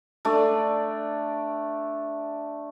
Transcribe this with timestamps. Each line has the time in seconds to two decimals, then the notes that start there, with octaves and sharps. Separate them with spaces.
0.25 A3 D4 D5